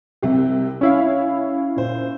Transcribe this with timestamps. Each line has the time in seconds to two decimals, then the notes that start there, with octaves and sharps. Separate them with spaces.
0.22 C2 C3 G4
0.81 C#4 E4 C#5 F5
1.76 A#2 C5